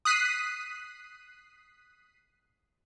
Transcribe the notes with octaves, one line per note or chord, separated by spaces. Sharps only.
D#6 F#6 B6 C7 D#7